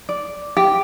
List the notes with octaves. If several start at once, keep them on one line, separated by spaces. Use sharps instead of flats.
D5
G4